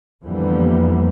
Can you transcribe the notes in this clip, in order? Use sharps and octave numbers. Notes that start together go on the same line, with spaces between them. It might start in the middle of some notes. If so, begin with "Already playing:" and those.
F2 D3 E3 G3 A#3 B3